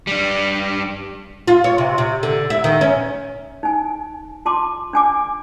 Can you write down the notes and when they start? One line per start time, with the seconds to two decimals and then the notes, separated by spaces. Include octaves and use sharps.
0.07 G3 D4
1.48 F4
1.64 C#5
1.78 C3
1.98 C3
2.23 D3
2.50 E4
2.64 D#3
2.81 C#4
3.63 D#4 G#5
4.45 F4 A5 C6 D6
4.93 D4 G#5 D6